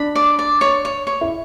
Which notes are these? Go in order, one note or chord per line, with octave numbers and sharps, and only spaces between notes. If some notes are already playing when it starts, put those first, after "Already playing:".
Already playing: D4 B5
D5
D5
C#5
C#5
C#5
E4